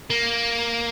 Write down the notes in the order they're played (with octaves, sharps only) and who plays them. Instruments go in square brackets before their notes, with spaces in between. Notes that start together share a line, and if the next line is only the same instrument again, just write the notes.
[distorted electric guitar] A#3